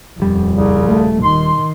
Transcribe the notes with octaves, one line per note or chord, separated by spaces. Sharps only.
D#1 F2 G3
C2 C#3
A3
D#3 C6